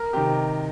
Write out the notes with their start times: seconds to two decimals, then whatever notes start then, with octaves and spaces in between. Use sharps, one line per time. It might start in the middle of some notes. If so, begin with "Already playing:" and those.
Already playing: A#4
0.13 C3 D#3 G4